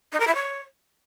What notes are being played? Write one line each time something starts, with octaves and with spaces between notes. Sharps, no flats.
D#4
A#4
E4
C#5